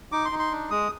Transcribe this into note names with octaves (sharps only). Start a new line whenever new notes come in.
D#4 D6
C6
D#4
C6
D4
G#3 D#6